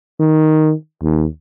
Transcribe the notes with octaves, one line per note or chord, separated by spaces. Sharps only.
D#3
D#2